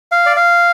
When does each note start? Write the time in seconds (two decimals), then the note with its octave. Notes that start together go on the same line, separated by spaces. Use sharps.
0.12 F5
0.26 D5
0.36 F5